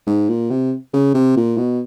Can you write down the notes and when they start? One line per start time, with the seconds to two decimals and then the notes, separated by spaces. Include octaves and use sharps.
0.07 G#2
0.29 A#2
0.50 C3
0.93 C#3
1.14 C3
1.36 A#2
1.58 B2